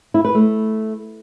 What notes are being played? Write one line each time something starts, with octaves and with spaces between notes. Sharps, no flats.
E4
B4
A3